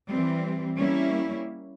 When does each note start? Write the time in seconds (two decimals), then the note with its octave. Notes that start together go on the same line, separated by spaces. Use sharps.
0.09 E3 G3 C4
0.78 G3 A#3 C#4 E4